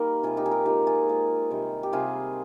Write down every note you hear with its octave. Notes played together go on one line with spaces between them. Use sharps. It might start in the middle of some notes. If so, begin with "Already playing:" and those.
Already playing: G3 A#3 D#4 A#4
C3 G3 F4 G#4
D#4 G4
G#4
G4 A#4
A#2 F3 G#3 D#4 G4
F4 G#4
A#2 F3 G#3
C3 D#3 G3
G4
C3 D#3 G3 F4 G#4